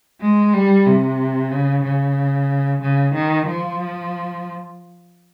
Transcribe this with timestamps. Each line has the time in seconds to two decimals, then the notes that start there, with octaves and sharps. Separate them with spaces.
0.21 G#3
0.54 G3
0.86 C3
1.51 C#3
1.84 C#3
2.82 C#3
3.14 D#3
3.46 F3